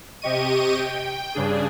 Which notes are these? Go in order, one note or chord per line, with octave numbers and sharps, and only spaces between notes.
C3 G4 D#5 C#6 D#7
G5
G2 C#3 D4 G#4